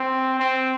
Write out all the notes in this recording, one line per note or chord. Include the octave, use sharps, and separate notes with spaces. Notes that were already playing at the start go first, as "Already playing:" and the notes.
Already playing: C4
C4